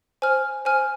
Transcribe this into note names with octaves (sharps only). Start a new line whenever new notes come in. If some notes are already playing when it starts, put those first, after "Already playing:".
C5 G#5 F6
C5 G#5 F6